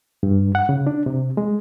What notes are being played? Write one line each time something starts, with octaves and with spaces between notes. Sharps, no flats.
G2
F#5
C#3
D4
C3
G#3